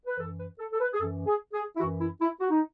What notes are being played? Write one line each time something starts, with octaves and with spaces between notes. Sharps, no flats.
B4
F#2 E3 A4
B4
A4
A4
B4
G#4
F#2 E3 A4
G#4
G#4
E4
F#2 E3 F#4
E4
E4
F#4
D#4